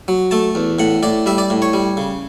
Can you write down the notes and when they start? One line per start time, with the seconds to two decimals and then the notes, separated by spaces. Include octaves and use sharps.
0.08 F#3
0.31 A3 A5
0.55 E2
0.79 A2 F#5
1.03 A2 D5
1.26 G3 E5
1.38 D5
1.50 A2
1.62 C#5
1.73 G3
1.97 C#3